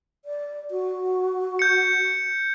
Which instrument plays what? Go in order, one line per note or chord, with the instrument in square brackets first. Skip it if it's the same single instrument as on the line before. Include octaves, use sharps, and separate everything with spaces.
[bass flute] D5
F#4
[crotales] G6 C#7